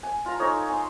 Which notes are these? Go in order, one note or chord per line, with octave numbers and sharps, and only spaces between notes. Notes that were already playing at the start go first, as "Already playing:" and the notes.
G#5
F4 A#5
D#4 A4 C#5 G#5
G#5 C6